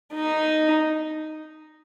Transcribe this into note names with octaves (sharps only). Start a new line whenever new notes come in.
D#4